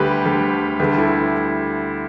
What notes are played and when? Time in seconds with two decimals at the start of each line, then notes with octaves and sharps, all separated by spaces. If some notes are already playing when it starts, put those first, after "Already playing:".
Already playing: D2 D3 G3 G4 B4
0.25 D2 D3 G3
0.79 D2 D3 G3 G4 B4
0.98 E4 A4